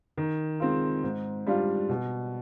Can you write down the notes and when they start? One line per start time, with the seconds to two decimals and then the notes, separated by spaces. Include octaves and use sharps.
0.18 D#3
0.60 G#3 C4 F4
1.03 G#2
1.47 G3 D4 F4
1.89 B2